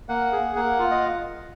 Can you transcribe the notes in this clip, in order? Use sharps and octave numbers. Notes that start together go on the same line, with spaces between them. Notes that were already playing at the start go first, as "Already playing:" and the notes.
A#3 F#5
G#4
A#3 F#5
F4
D#5